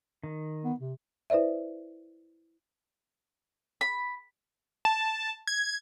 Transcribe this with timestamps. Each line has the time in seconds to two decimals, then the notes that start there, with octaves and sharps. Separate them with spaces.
0.24 D#3
0.65 B3
0.80 C3
1.30 E4 B4 C5 D5 E5
3.81 B5
4.85 A5
5.47 G#6